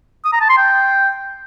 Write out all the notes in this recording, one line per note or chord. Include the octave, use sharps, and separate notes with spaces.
D#6
A#5
A5
C6
G5